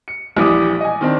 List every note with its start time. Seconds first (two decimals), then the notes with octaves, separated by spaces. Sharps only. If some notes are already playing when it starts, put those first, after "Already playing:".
0.08 C#7
0.37 A#1 E3 G3 D6 D#6
0.81 D#5 G#5
1.01 D#3 C4 D4